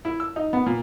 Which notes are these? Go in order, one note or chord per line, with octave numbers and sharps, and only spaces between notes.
E4
E6
D#4
B3
A#2